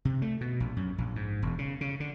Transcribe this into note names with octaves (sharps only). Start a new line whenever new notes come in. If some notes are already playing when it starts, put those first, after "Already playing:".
C3
A3
B2
A#1
F#2
A#1
G#2
E1
C#3
C#3
D3